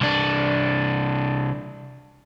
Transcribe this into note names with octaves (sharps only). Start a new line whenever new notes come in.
C2 D4